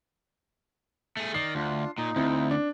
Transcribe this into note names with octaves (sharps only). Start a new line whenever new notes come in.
A3 G#4
D#3 D5 C7
D2 D4 F4
A#2 D#4
D2 C4 E4
D4